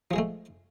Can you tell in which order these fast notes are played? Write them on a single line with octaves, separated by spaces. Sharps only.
F3 G#4 G#3 A3